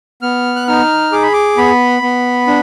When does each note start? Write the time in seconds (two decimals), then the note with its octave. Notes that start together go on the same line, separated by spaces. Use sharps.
0.22 B3 F6
0.56 F#6
0.67 D#4 F6
1.12 G#4 D6
1.22 B5
1.33 D6
1.57 B3 B5
2.02 B3
2.47 D4